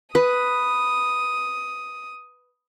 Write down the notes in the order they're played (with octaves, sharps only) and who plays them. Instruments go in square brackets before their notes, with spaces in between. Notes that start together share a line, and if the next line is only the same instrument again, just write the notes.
[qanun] B4 [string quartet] D#6